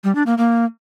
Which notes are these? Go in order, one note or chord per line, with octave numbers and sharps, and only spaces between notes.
G3
D4
A#3
A#3